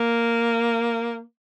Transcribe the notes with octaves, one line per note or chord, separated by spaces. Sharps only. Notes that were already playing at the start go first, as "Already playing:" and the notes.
Already playing: A#3